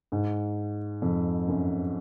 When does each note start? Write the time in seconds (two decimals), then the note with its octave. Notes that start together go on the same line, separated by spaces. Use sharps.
0.12 G#2
1.02 F2
1.48 F#2